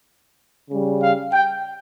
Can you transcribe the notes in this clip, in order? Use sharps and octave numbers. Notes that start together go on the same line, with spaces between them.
C#3 G3
F5
G5